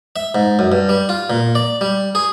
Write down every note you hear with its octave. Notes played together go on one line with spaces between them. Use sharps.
E5
G#2
F#2
G2
G3
F4
A#2
D5
G3
G#4